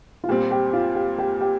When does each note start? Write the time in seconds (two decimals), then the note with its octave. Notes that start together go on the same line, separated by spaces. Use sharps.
0.24 F4
0.29 A#2 G3 C4 G4
0.51 G4
0.73 F4
0.95 G4
1.18 G4
1.41 G4